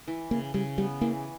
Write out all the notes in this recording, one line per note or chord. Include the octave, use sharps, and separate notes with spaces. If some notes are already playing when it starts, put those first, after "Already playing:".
E3
C#3 A#3
C#3 G3
G3 B3
E3 A#3